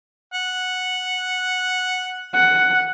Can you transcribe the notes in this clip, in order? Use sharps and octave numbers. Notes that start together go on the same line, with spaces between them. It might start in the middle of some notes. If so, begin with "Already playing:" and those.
F#5
F#5